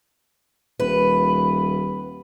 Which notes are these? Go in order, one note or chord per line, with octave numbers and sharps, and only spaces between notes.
D#1 B4